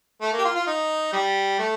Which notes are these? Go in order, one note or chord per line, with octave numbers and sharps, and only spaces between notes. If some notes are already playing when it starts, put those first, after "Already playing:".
A3
A#3
G4
F4
F4
D#4
G3
A3